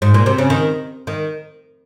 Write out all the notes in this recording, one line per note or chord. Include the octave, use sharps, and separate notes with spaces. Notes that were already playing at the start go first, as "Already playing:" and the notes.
G#2
A#2
C3
C#3
D#3
D#3